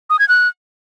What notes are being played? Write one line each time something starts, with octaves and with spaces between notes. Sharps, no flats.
D#6
G#6
F#6